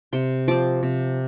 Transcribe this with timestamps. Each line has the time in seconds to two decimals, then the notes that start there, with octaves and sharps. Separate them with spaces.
0.13 C3 C6
0.48 F3 C4 D6
0.83 C3